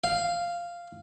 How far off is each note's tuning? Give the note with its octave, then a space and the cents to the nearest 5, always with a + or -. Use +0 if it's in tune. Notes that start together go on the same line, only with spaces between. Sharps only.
F5 -5